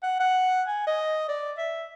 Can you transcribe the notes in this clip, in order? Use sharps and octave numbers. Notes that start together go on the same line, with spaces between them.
F#5
F#5
G#5
D#5
D5
E5